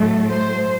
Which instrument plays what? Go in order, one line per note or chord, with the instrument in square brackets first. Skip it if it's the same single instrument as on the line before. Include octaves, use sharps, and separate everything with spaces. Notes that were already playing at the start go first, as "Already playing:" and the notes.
Already playing: [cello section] A2 F#3 A3
C5